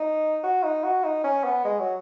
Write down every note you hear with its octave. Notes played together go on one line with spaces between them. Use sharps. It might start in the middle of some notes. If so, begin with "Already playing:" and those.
Already playing: D#4
F#4
D#4
F#4
D#4
C#4
B3
G#3
F#3